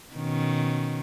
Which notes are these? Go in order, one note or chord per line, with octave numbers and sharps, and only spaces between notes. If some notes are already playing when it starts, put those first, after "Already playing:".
B2 D#3 C#4